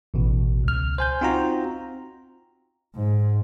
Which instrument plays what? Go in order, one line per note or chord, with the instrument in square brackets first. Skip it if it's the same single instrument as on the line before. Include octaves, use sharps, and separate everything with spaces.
[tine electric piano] A1 B2
C#2 F6
C5 G#5 G6
C4 D#4 F4 F#4 A#5
[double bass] G#2